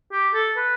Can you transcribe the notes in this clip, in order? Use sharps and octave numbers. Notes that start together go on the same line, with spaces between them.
G4
A4
B4